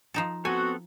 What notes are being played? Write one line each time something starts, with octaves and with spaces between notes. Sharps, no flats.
F3 D#4 A4
B3 C4 F#4 A4 G#5